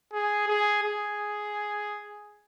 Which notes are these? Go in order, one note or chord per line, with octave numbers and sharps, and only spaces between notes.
G#4
G#4
G#4